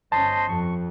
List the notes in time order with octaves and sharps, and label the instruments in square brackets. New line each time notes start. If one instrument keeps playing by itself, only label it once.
[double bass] G1 C#4 [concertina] C5 D#5 C6 [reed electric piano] A5
[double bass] F2 [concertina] C#6